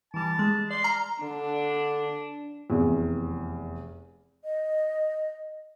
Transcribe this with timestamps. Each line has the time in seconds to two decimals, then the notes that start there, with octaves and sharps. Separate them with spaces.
0.14 E3 G3 A5
0.39 G#3
0.70 D5 C6
0.84 A#5 F6
1.22 D3 D4
2.70 F1 E2
4.44 D#5